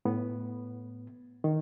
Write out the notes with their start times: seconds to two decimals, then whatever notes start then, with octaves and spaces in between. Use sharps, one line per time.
0.05 A2 B3
1.44 D#3